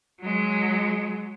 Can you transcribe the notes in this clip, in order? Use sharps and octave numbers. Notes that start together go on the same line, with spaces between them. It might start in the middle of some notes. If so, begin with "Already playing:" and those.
F#3 G#3